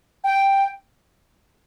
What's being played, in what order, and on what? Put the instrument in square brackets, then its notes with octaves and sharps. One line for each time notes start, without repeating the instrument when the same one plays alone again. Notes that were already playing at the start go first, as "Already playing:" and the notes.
[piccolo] G5